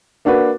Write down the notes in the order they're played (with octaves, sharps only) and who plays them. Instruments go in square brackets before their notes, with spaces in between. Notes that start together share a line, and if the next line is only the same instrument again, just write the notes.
[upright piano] A#3 D4 F#4 B4